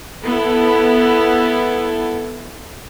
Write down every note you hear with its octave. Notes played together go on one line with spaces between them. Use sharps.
B3 E4 A4